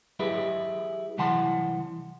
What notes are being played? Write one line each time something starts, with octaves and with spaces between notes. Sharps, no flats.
F#3 E4 G4 G#4 B4
C2 E3 F#3 F#5 A5 C6